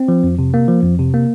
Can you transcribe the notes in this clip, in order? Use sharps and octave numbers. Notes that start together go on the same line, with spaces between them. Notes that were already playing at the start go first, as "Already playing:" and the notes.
Already playing: C4
F3
F2
C3
A#3
F3
F2
C3
A#3